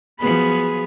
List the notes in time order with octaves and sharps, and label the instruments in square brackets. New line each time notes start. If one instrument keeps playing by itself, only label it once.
[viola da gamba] F3 F#3 B3 [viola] G#4 B5